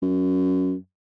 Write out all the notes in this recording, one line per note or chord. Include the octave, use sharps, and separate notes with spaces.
F#2